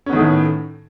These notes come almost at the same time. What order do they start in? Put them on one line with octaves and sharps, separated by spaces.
C#4 B3 D#3 A3 A2